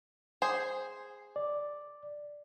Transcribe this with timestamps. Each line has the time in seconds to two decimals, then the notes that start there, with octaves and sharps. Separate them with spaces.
0.42 G#4 C5
1.36 D5